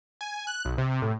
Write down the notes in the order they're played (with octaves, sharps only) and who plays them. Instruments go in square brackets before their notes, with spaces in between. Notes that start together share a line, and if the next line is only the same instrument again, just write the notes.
[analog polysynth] G#5
F#6
B1
C3
A2